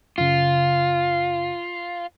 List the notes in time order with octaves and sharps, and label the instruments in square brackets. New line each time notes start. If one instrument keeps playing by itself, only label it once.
[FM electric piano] F#2 C#3 [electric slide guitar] F4